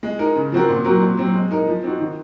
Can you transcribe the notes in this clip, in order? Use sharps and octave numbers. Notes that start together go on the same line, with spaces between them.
G#3
D#4 A#4
C#3
F3 C4 F#4 A#4
A#2
F#3 C4 F#4 A#4
A#2
F#3 C4
G#3
D#4 A#4
F3
C4 D#4 F#4
D#3